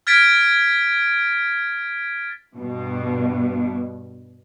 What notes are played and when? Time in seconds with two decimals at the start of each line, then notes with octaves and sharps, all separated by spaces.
0.07 F6 G#6 A6 B6 D7
2.56 G2 B2